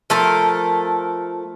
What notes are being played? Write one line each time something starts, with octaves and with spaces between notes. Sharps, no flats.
F3 A3 A4 A#4